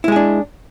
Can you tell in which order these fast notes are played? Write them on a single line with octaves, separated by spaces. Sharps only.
E4 G#3 G#4 D4